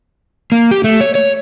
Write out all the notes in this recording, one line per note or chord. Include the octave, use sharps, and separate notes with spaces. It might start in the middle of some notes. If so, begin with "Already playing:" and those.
A#3
G4
A3
C#5
C#5